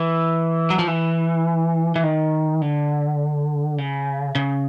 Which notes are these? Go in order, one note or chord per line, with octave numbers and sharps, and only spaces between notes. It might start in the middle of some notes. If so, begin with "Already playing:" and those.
Already playing: E3
F#3
F3
E3
E3
D#3
D3
C#3
C#3